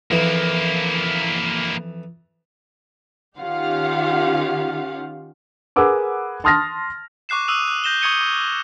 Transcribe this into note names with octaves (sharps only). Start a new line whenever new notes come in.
F2 E3 A#3 E4
D#3 C#4 F4 G4 F5 F#5
G#4 A#4 B4 F#5 D6 E6
A5 C6 D#6 F6 A6 A#6
C#6 D6 F#6 C7 E7
D#6 E6 F#6 D#7 F7
F#6
G6 A#6 E7 G7
C#6 D#6 G#6 C#7 D#7 G7
C#6